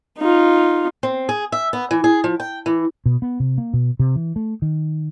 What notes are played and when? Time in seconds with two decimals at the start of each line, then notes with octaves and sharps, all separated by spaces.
0.18 D#4 F4
1.03 C4
1.29 G#4
1.52 E5
1.73 B3
1.91 E3
2.04 G#4
2.24 F3
2.40 G5
2.66 E3
3.06 B2
3.22 B3
3.40 C3
3.58 A#3
3.73 B2
3.99 C3
4.16 E3
4.36 A3
4.62 D#3